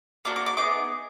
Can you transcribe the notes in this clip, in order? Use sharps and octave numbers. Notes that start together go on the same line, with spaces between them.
A#3 D4 F#4 D6
D6
D6
B3 D#4 G#4 D6